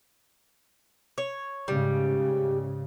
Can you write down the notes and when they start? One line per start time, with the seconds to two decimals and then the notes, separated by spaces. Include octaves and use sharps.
1.18 C#5
1.68 G#2 C#3 G3